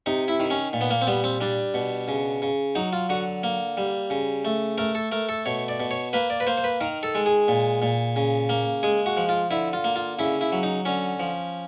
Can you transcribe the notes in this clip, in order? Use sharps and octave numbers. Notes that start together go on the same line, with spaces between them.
C3 D#4
E4
D#3
C#4
A#2
B3
A#3
C4
G3 B3
C4
G3 D4
B2
C#3
C#3
F#3 D#4
F4
D3 F#4
A#3
G3
C#3
A3
A3 A#4
A4
A3 A#4
A4
B2 C#5
D5
B2
C#5
A#3 B4
D5
B4
A#3 C5
C5
B4
D#3 A#4
A4
G#3
G#4
A#2
A#2
C#3
A#3
G#3 G#4
F#4
F3
F4
D3 E4
F4
A#3
F4
C#3 E4
E4
F#3
D#4
D3 C#4
F3